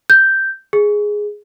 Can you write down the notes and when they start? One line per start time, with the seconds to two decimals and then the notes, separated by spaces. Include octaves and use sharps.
0.10 G6
0.73 G#4